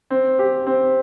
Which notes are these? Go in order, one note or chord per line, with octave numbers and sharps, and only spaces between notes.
C4
G4
C4